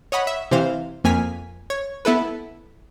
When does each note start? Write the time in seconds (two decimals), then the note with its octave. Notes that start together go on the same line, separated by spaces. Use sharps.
0.12 C#5 D#5 F#5 B5
0.27 E5
0.51 C3 E3 C5 F5
1.04 F2 A#3 G#5 F6 B6
1.70 C#5
2.05 B3 E4 A4 B4